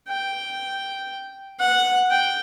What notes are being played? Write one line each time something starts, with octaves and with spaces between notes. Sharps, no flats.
G5
F#5
G5